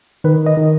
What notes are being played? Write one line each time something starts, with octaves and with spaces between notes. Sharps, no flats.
D#3 B4
D#5
D#3